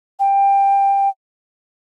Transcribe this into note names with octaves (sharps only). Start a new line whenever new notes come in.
G5